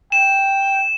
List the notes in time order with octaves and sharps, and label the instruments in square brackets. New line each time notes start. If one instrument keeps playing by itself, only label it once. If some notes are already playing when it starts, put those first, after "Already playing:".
[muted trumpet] G5 [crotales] E7